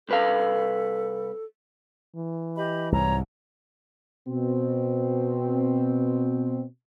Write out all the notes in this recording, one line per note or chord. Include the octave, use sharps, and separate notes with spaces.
C2 A4 B4 F5
E3
G4 D#5 B5
C2 G#2 C#5 A#5
B2 C4